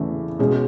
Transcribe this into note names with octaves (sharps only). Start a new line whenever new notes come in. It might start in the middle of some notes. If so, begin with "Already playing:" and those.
Already playing: E2 C#3 E3 A3
B2 G#3 C#4